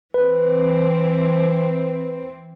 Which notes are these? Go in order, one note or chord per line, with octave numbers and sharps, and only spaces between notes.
E3 C4 B4